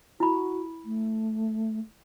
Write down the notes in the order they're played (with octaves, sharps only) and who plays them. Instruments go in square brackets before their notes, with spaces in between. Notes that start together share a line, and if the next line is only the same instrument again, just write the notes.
[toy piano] E4 B5 [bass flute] F#4
[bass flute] A3